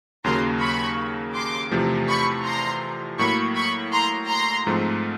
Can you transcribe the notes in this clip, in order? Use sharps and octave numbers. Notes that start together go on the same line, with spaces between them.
D#2 C#3 F#3 A#3 A#5 C6
B5 C#6
C6 D6
E2 C3 F3 A3
B5 C#6
A#5 C6
A2 F#3 A#3 B5 C#6
B5 C#6
A#5 C6
A#5 C6
G#2 F3 A3 C4